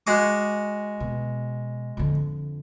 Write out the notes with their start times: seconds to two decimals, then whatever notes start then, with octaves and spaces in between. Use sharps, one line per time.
0.07 G#3 F#4 D6
1.00 B2
1.97 F2 D3